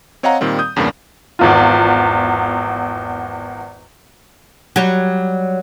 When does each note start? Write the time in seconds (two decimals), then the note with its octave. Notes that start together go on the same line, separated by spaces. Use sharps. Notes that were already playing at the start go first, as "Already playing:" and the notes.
0.23 C4 C#5 D#5 F5 F#5 A#5
0.41 A#2 D#3 G3 C4
0.59 D#6 G6
0.76 E2 G2 C#3 G3 A#3
1.39 G#1 E2 F4
4.76 F#3 G3